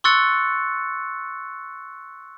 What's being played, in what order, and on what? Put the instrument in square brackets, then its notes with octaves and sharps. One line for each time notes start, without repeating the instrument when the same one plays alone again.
[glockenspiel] C6 C#6 E6 F#6 A6 C#7